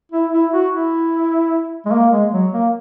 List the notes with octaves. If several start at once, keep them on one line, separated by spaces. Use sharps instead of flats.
E4
E4
F#4
E4
G#3
A#3
G#3
F#3
A#3